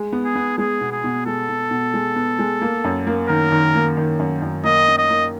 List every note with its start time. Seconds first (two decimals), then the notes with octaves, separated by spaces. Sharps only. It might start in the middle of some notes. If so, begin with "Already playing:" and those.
Already playing: G#3
0.12 B3
0.24 G#4
0.35 B3
0.58 G#3 G#4
0.81 B2
0.92 G#4
1.04 B2
1.26 G#3 A4
1.49 B2
1.71 B2
1.94 G#3
2.16 B3
2.39 G#3
2.61 A#3
2.84 F#2
3.07 A#3
3.29 D#3 A#4
3.52 D#3
3.75 A#3
3.97 D#3
4.19 F#2
4.42 F#2
4.64 A#3 D#5
4.88 F#2
4.98 D#5
5.10 A#3